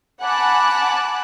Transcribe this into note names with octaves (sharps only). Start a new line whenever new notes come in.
F#5 G#5 A5 B5 D6 F#6